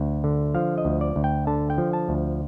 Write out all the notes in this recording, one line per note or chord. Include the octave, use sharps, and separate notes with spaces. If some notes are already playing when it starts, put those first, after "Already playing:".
Already playing: D2
D3
F3 F5
D#5
D2
D5
D2
G5
D3 A5
G5
F3
A5
D2